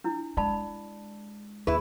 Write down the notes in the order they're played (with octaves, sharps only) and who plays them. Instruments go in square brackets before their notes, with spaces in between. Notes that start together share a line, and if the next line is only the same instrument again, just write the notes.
[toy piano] D4 E4
[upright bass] G#3 [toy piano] D5 A5 B5
[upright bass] D#2 [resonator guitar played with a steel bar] E4 B4 [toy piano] G#4